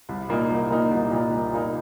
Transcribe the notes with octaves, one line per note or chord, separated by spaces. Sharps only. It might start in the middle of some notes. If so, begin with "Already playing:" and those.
C2
A#2 A#3 D#4
C2
A#2 A#3 D#4
C2
A#2 A#3 D#4
C2
A#2 A#3 D#4